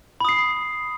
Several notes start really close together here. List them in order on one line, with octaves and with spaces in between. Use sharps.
B5 D#6 C7